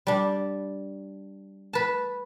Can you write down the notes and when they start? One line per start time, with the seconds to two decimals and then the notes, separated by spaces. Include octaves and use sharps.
0.07 G3 D4
1.73 B4 A5